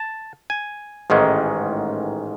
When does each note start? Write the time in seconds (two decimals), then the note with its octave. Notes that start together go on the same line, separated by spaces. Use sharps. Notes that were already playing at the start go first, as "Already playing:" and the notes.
Already playing: A5
0.50 G#5
1.10 A1 G#2 D#3 G#3 C#4